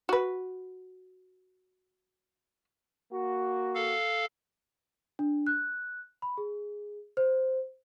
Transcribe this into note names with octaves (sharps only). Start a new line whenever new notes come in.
F#4 B4
A#3 F#4
A4 F5
D4
F#6
B5
G#4
C5